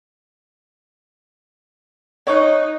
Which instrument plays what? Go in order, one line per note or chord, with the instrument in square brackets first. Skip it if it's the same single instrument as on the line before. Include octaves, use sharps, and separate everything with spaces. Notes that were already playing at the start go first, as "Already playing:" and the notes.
[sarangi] D#4 [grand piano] C#5 C#6 F#6